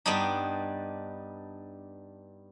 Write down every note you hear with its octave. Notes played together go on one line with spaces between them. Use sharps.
G2 G3 B3 D4 D#4